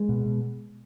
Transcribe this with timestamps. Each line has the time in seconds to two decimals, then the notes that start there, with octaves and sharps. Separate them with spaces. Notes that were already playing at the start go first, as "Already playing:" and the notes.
Already playing: G#3
0.09 B2
0.26 B2